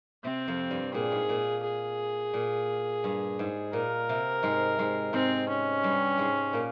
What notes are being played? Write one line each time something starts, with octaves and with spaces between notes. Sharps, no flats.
C3 C4
F2 F3
G2 G3
A#2 G#4
G#2
A#2
G#4
A#2
G2
G#2
A#2 A#4
C3
G#2 G#3
G#2 G#3
G#2 G#3 C4
C#4
G2 G3
G#2 G#3
A#2 A#3